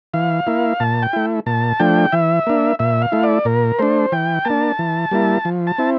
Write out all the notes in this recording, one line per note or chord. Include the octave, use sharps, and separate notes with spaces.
E3 F5
A#3 E4
A#2 A5
G5
A3 E4
A#2 A5
F3 A3 D4 G5
E3 E5
A#3 D4
A#2 E5
F5
A3 E4
D5
A#2 A#4
A3 D4 C5
E3 G5
A#3 D4 A5
E3
G3 A#3 E4
F3
A5
C4 E4